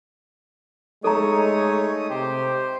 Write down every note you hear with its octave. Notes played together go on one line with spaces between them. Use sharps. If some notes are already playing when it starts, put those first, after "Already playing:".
G#3 A3 D#4 A4 C#5 A#5 D#6
C3 G4 C5